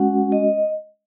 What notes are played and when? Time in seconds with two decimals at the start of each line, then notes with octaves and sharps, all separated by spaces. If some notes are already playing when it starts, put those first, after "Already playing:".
Already playing: G#3 C#4 F#4 F#5
0.32 D#5